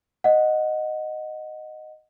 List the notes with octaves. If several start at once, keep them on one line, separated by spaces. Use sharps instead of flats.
D#5 F#5